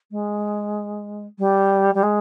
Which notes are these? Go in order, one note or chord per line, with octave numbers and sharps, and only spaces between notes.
G#3
G3
G3
G#3